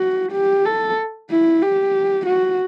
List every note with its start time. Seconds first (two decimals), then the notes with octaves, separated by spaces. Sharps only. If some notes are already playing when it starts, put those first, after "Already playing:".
Already playing: F#4
0.32 G4
0.65 A4
1.30 E4
1.63 G4
2.27 F#4